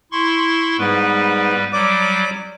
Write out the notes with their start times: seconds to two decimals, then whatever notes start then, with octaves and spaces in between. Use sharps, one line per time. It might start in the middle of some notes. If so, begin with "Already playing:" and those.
0.12 E4 C6 C#6
0.79 G#2 G3 B3 B4
1.73 F#3 G3 D5 D6